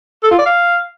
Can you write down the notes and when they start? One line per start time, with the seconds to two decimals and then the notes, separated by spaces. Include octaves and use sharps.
0.23 A4
0.31 F4
0.38 D5
0.46 F5